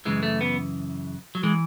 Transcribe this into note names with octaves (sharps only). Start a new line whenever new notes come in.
F#2 C#3 E3 G#3
A3
B3
F#3
E3 G#3